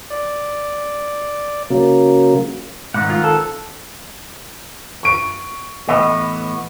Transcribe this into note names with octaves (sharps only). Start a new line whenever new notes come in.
D5
C#3 F#3 A#3
G#2 D#3 C4 F#5
F4
A4
C#6 D7
A2 E3 B3 D#5